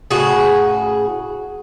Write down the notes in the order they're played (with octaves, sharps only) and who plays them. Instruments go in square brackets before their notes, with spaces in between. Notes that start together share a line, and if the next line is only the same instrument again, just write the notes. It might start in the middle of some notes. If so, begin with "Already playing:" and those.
[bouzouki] A2 C#3 F#4 G#4